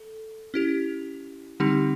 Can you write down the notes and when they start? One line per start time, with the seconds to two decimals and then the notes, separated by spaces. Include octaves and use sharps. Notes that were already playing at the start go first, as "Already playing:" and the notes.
Already playing: A4
0.54 C#4 E4 G4
1.60 D3 G3 C4 D#4 G4